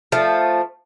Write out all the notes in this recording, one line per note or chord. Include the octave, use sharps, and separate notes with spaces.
F3 A3